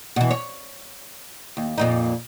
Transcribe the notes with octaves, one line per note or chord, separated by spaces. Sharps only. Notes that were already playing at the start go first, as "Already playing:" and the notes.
B2 E3
C#5
D#2
F2 A#2 D#4